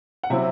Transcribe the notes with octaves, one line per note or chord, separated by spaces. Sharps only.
F#5
C3 F#3 C4 E4 E5